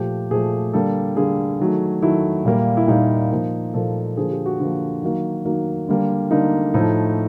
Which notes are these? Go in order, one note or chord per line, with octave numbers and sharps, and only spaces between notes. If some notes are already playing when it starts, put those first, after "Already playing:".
Already playing: A#2 F3 A3 G4
A#2 F3 A3 G#4
D3 G3 A#3 A4
D3 G3 A#3 G#4
D#3 F#3 A3
D#3 F#3 A3 E4
A#2 G3 A#3
E4
A#2 G3 A#3 D#4
A#2 F3 A#3
A#2 F3 A#3 A4
D3 F3 A#3 G#4
G4
F#4
D3 F3 A#3
D#3 F#3 A#3
D#3 F#3 A#3
D3 G3 A#3
D3 G3 A#3 D#4
A2 F3 A3 D#4